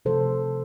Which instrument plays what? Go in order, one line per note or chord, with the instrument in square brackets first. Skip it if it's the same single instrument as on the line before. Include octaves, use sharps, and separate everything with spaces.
[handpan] C3 F3 A3 A4 C5